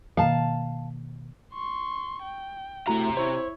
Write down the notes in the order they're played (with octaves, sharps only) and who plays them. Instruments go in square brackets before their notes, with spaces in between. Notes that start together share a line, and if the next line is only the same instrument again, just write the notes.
[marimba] B2 D#3 A#3 [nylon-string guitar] F5 A5
[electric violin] C6 C#6
G5
[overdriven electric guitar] C3 A#5 [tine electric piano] A3 E4 F#4
[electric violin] E4 C#5 [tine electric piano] C5